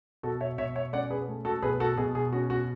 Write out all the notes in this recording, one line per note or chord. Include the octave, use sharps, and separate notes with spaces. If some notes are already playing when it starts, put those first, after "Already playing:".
B2 F#4 A4
C#5 E5
B2 C#5 E5
C#5 E5
C#4 D5 F#5
G#4 B4
A3
F#4 A4
B2 G#4 B4
F#4 A4
B2 G#4
G#4
C#4 F#4
F#4